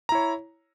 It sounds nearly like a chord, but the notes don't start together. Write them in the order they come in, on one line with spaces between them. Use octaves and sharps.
A#5 E4 C#5